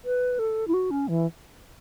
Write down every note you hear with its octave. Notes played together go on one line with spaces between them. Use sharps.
B4
A4
E4
F#4
C#4
E3